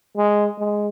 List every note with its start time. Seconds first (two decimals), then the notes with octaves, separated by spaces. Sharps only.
0.17 G#3
0.59 G#3